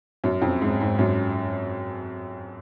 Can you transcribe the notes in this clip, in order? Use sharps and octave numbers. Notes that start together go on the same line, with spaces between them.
F#2
F2
G#2
G#2
F#2